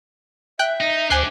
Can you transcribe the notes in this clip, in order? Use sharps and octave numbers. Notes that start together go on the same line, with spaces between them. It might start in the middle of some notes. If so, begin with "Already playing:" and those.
E5 G5 F#6
D#4
D2 D4 G4 C5 G#5 F#6 C7